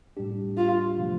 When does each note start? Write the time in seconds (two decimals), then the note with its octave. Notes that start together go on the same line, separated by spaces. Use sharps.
0.17 A2 G3 D4 G4
0.57 F4
0.99 C3 F3 A3